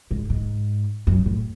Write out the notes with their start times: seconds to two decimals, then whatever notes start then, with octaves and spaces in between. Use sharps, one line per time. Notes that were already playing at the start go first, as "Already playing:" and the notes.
0.11 G#2
0.30 G#2
1.07 F#2
1.26 A2